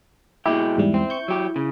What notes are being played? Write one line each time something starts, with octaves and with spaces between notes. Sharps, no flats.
B2 G#3 E4 G4
E2 G#2 G3
C4
C#6 G6
F#3 G4
C#3